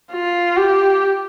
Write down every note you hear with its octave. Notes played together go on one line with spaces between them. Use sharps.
F4
G4